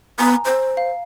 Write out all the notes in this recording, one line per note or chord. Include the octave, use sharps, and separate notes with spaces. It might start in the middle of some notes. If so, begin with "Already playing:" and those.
B3 G#5 A#5
C5
F5